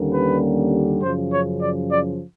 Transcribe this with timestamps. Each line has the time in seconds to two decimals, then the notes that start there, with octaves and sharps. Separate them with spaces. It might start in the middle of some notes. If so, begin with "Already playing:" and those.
Already playing: D#2 D3 G3 A#3 C#4
0.12 B4
1.01 F#2 C#3 F3 C5
1.31 C#5
1.61 D5
1.90 D5